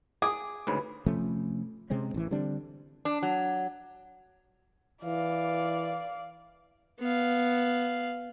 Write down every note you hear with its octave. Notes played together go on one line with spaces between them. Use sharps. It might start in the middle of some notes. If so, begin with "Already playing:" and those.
G#4 D6
D2 G#2 C#3 B4
C3 F3 A3 C#4
C3 G#3 C4 C#4
A1 E3
D3 G3 C4 D4
D4
F#3
E3 D5 F5
B3 F5